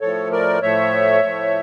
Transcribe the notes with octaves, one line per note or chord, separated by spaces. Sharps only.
A2 F3 A3 A4 C#5
A#4 D5
A2 F3 A3 C#5 E5
A2 F3 A3